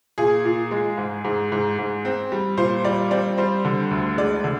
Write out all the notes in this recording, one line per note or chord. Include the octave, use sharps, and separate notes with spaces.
A#2 G#4
A#2
G#3
G#2
G#2
G#2
G#2
C4
G3
A#2 C5
G3 D5
C4 D5
G3 C5
D3
D2
G#3 D5
D3